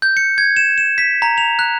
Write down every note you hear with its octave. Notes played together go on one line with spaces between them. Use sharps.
G6
C#7
G#6
E7
E7
B6
A#5
F7
F#6